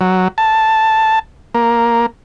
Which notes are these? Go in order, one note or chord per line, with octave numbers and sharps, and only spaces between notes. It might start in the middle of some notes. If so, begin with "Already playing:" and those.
F#3
A5
A#3